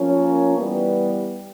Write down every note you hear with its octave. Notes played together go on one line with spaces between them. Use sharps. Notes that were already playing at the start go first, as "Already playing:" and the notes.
Already playing: F3 A#3 C#4
E3 G3 B3